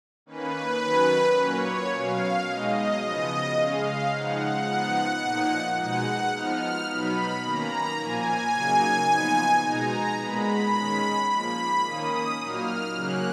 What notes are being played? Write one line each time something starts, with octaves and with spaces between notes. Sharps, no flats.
D#3 A#3 C#4 B4
D#3 F#3 C#4
A#2 F#3 A#3 C#4 C#5
B2 F#3 C#4 F5
B2 G#3 D#4 D#5
C#3 F3 B3 D#5
C#3 G#3 C#4 F5
C#3 F3 G#3 D#4 F#5
F3 B3 D#4
A#2 F3 A#3 D#4
B2 G#3 D#4 F#5
F3 B3 D#4 F6
B2 F#3 B3 D#4 B5
D#3 A#3 C#4 A#5
A#2 F3 A#3 G#5
C#3 F#3 A#3 D#4
A#2 F3 B3 D#4
B2 G#3 D#4 A#5
A#2 G#3 B3 B5
D#3 G#3 C#4
A#2 F3 A#3 B5
D#3 A#3 C#4 D#6
A#2 F#3 A#3 D#4 F6
C#3 F#3 A#3 C#4 F#6